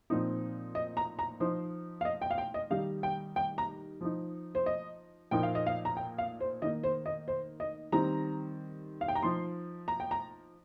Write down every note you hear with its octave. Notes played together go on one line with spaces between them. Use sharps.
A#2 F3 C4 D#4
D#5
A#5
A#5
F3 D#4 C5
F5
D#5
G5
F5
G5
D#5
D#3 G3 D#4 F5
G5
G5
A#5
F3 D#4
C5
D#5
A#2 F3 A#3 D#4 G5
F5
D#5
F5
A#5
G5
F5
C5
D#3 A#3 D#4 D#5
C5
D#5
C5
D#5
D#3 G3 C4 A#5
F5
G5
A#5
F3 D#4 C6
A#5
G5
A#5